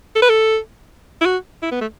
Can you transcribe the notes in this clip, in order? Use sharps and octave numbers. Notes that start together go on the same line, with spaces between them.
A4
B4
A4
E4
F#4
E4
B3
A3